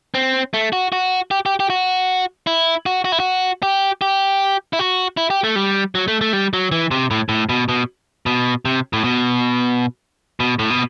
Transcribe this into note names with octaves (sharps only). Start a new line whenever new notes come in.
C4
A3
F#4
F#4
G4
G4
G4
F#4
E4
F#4
F#4
E4
F#4
G4
G4
E4
F#4
E4
G4
A3
G3
F#3
A3
A3
G3
F#3
E3
C3
A2
A2
B2
B2
B2
C3
A2
B2
B2
A2
B2